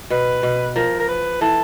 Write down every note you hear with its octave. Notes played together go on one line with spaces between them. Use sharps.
B2 B4
B2
F3 A#4
A#4
B4
E3 A4